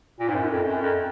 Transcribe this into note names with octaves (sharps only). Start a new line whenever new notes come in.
A#2
G#2
F#2
F2
F#2
F2